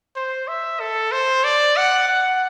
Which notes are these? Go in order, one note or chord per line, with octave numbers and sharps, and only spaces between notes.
C5
E5
A4
C5
D5
F#5
F#5